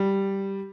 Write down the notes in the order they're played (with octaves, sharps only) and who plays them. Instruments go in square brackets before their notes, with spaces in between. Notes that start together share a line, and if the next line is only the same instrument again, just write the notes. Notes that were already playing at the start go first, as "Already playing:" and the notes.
Already playing: [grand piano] G3